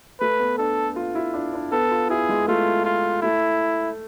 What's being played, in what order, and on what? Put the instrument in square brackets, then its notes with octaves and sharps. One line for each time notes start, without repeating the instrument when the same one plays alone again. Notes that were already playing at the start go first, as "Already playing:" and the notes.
[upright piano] A3 [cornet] B4
[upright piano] B3
[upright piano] D4 [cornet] A4
[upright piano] F4
E4
D4
D4
[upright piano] B3 [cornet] A4
[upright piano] F4
[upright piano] E4 [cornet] G#4
[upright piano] G#3
[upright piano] A3 [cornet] F4
[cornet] F4
[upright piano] A3 [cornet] E4